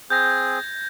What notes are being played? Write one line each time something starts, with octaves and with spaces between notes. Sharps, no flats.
C4 G#4 G6 G#6 A#6